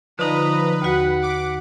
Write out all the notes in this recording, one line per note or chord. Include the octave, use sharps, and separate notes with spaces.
D3 F3 D#4 B4 D#5 A#5
D#2 F#4 F#5 B6
D6